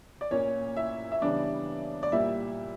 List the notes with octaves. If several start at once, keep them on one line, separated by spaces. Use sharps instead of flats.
D5
A#2 A#3 C#4 C#5
E4 E5
E5
C#3 E3 G3 B3 D4 D5
D5
A#2 G3 A#3 E4 E5